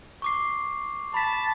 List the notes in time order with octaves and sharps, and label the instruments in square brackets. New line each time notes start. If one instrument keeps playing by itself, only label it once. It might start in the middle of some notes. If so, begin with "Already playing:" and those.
[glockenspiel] C#6 D6 C7
[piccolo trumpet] A5 [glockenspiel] B5 B6